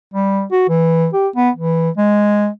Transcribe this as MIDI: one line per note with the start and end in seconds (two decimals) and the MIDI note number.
0.14 0.45 55
0.52 0.64 66
0.69 1.08 52
1.14 1.28 67
1.36 1.50 59
1.56 1.90 52
1.98 2.48 56